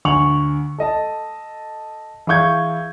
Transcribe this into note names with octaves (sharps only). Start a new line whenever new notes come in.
D2 G#5 C#6 F7 F#7
A4 D#5 A5
E3 G#4 F5 C#6 G6 G#6